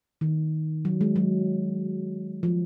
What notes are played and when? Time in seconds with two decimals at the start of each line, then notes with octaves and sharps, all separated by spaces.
0.21 D#3
0.85 F#3
1.01 G#3
1.16 F#3
2.43 F3